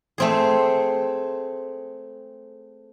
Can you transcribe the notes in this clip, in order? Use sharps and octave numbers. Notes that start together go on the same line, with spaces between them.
A3 C4 G#4